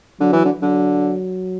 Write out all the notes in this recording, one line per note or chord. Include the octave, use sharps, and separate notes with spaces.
D3 F#3
E3
D3
D3 F#3